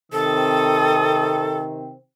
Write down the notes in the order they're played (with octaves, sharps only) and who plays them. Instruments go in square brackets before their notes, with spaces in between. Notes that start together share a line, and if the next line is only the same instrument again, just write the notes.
[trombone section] C3 D#3 C4 [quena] A4 [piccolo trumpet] D#6